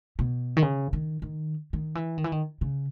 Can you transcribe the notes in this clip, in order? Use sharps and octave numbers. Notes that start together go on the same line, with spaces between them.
B2
D#3
C#3
D#3
D#3
D#3
E3
D#3
E3
D#3
C#3